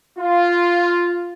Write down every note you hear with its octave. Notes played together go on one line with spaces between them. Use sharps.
F4